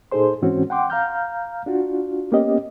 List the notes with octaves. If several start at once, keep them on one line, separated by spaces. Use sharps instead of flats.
A#2 D#4 G#4 A4 C5 C6
G#2 E3 C4 C#4 F#4
F#5 G5 C6 D6
F5 A#5 F6 G6
D4 F4 F#4
A#3 B3 C#4 G4 D#5